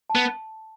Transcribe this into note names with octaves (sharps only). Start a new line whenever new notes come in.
A5
B3